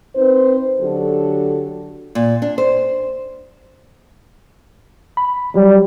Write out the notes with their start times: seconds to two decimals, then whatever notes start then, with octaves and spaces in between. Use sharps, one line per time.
0.16 C4 D#4 B4 C5
0.80 D3 F#3 D4 F#4 G4 A4
2.15 A#2
2.42 D4
2.58 C5
5.17 B5
5.55 F#3 G3